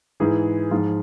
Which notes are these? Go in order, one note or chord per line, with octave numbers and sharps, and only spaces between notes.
G#2 E3 G#4
G#2 F3 F4